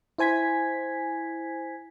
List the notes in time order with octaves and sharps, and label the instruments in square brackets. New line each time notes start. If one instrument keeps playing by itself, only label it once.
[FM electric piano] E4 C5 G#5 G#6 B6